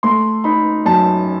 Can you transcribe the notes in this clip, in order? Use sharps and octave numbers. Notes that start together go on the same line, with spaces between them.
A3 C6
D#4 B5
F#2 A5